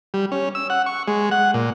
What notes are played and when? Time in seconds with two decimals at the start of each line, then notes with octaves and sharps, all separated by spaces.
0.14 G3
0.32 C#4
0.55 E6
0.70 F#5
0.86 C#6
1.08 G#3
1.31 F#5
1.54 A#2